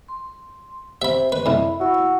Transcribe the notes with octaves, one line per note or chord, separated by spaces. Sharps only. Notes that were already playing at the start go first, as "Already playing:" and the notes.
C6
C3 C5 E5 B5
B4 D#5
C2 F2 E4 B5
E4 F#4 E6